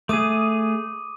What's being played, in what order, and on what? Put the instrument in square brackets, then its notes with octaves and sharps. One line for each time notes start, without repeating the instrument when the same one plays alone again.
[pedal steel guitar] A3 G#4 [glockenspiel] D6 D#6 D#7